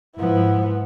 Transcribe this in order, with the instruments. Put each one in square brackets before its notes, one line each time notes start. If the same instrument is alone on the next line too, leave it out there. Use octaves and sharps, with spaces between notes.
[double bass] G#2 F3 [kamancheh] B3 E4